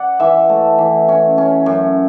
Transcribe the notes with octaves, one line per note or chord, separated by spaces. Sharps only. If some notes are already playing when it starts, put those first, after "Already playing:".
Already playing: D5 F#5
E3 E5
A3
E3
C#4
C#4
F#2